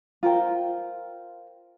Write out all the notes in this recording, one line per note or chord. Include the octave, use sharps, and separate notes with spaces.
F4 A#4 C5 G5